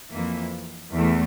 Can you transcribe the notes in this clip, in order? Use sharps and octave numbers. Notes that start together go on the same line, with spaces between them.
F2 E3 A#3
E2 E3 A3